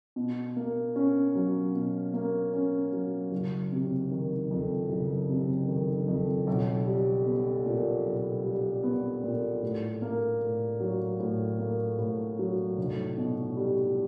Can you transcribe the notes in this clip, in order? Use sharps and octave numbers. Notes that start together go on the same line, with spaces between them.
B2
A#3
C#4
F#3
B2
A#3
C#4
F#3
F#1
C3
D#3
F2
F#1
C3
D#3
F2
B1
G3
B3
A#2
B1
G3
B3
A#2
A2
A#3
A2
F#3
A2
A#3
A2
F#3
F1
B2
G3